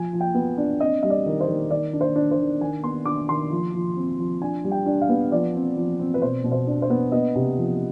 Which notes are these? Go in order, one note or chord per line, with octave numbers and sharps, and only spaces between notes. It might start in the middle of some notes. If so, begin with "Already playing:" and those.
Already playing: F3 G#5
F3
G5
B3
D4
C4 D#5
G3 D#5
D5
D#3
C5
D#3
D#3 D5
D4
C5
D4
C5
D#3
D#3 G#5
B3 C6
D4 D6
D#3 C6
F3
F3
C4
F3
D4 G#5
G3
G5
D4
F5
B3
F3 D5
C4
F3
C4
B4
B2 C5
B2
C5
D4
C5
B3
B3 D#5
C3
F3